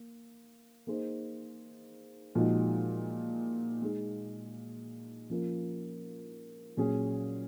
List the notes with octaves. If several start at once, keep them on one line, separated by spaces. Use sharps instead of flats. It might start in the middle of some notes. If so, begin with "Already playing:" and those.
Already playing: A#3
A#3 D#4 G#4 C5
A#2 F3 G#3 D#4 F#4
G#3 D#4 G#4
F3 A#3 C#4 F4 A#4
A#2 F#3 C#4 G#4